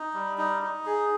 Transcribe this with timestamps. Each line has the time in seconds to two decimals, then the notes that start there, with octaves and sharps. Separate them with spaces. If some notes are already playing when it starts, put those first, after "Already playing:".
Already playing: D#4
0.14 G3
0.38 D#4
0.62 D#4
0.86 G#4